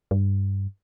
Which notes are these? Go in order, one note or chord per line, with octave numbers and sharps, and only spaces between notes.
G2